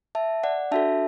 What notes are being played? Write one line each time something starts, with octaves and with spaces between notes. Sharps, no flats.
E5 A5
D5 F#5
D4 F#4 A4 E5 A5